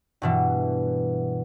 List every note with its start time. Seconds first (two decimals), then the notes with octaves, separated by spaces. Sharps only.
0.22 G2 B2 E3